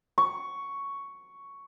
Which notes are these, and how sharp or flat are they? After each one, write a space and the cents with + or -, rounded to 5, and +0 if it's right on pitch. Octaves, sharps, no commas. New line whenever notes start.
C#6 +5